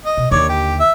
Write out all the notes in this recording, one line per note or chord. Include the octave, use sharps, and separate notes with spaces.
D#5
B2
D#2 D3 C#5 D5
G4
E5